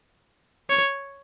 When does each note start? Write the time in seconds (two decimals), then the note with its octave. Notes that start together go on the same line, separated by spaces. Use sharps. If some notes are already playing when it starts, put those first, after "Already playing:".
0.70 C#5